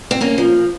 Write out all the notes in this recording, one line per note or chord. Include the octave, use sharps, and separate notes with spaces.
C4
A#3 C#4
F3